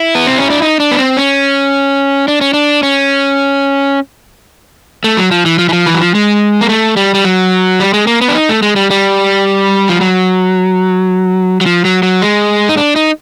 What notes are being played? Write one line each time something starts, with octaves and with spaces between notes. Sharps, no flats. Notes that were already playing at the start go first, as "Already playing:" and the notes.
Already playing: E4
B3
C4
C#4
D4
D#4
D4
B3
C4
C#4
D4
C#4
D4
C#4
A3
F#3
F3
E3
F3
E3
F3
E3
F#3
F3
G#3
A#3
A3
G3
G3
F#3
G3
G#3
A#3
B3
D4
D#4
A3
G#3
G3
G3
F3
F#3
F#3
F3
F#3
F#3
G#3
D#4
D4
D#4